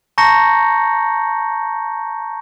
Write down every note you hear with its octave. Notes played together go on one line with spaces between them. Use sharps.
A5 A#5 C#6 G6 A#6 C#7